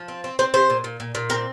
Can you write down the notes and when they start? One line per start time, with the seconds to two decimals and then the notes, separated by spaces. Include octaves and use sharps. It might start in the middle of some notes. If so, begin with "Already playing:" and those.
Already playing: F3
0.08 C4
0.24 C4
0.39 C4 C5
0.54 C3 C5
0.70 A#2
0.84 A#2
1.00 A#2
1.15 A#2
1.30 C4 A#4